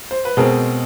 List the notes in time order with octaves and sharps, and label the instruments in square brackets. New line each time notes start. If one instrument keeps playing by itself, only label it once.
[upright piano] C5
B4
B2 G#3 C4 G#4 A#4